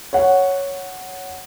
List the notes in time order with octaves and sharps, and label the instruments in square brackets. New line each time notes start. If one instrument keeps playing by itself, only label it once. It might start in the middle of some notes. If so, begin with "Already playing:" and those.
[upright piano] C#5 F#5